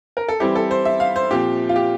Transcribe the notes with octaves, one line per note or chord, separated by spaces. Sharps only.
A#4
A4
E3 G3 C4 E4 G4
A4
C5
E5
F5
C5
A#2 F3 C4 G4
F4
G4